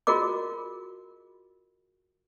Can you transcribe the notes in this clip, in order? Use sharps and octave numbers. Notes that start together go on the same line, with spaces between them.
F4 F#4 G#4 A#4 D#5 D6